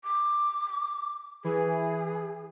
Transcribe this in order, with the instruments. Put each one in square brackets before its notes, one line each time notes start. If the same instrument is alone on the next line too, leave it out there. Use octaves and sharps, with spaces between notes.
[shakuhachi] D6
[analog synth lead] E3 [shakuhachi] G#4